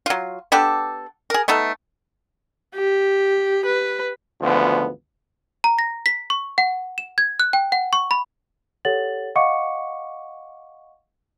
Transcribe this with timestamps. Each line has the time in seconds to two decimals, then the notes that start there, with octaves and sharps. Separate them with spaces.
0.06 F#3 F4
0.52 B3 D4 G4 A4
1.30 G#4 A#4
1.48 A3 B3 D#4 A4
2.75 G4
3.65 B4
4.42 G#1 D2 F3 B3
5.64 A#5
5.79 A#6
6.06 B6
6.30 C#6
6.58 F#5
6.98 E7
7.18 G#6
7.40 F#6
7.53 G5
7.72 F#5
7.93 C#6
8.11 B5
8.85 G4 A4 C#5 F#5 A6 F#7
9.35 D#5 F5 F#5 C#6 D6 C#7